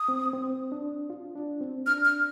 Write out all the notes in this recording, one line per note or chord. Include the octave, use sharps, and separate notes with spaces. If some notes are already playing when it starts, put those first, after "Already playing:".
Already playing: D#6
C4
C4
D4
F4
D4
C4
D4 F6
F6